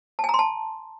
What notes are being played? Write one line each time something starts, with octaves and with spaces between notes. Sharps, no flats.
A5
G#5
A#5
C6
A5